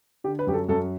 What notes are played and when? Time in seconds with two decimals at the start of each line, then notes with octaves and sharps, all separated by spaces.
0.24 D3 G4
0.39 B4
0.47 F#2 G4
0.53 A4
0.69 F#2 A4